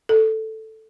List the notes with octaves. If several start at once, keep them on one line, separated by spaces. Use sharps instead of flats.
A4